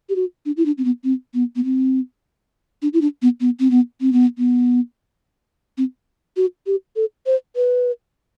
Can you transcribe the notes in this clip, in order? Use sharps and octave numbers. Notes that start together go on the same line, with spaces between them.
G4
F#4
D4
E4
D4
C4
B3
C4
B3
B3
C4
D4
E4
D4
B3
B3
C4
B3
C4
B3
B3
C4
F#4
G4
A4
C5
B4